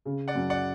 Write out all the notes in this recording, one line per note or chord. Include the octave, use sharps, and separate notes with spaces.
C#3
D5 F#5
F#2
D5 F#5